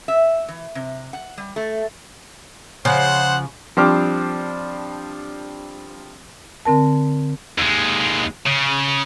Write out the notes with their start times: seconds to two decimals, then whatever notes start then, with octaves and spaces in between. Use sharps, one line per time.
0.08 E5
0.48 E3
0.75 C3
1.13 F#5
1.38 G3
1.56 A3
2.85 C#3 F3 C5 F#5
3.77 F3 G3 C4 D4 D6 F6
6.66 D3 C4 A#4 A5
7.58 D#2 G#3
8.46 C#3